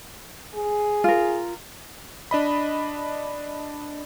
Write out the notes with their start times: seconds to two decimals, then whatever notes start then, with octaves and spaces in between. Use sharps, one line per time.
0.55 G#4
1.04 F4 A#4
2.31 D4 D#5 B5